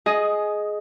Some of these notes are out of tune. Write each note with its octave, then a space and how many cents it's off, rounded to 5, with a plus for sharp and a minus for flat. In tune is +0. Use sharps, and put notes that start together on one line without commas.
G#4 +15 D#5 +0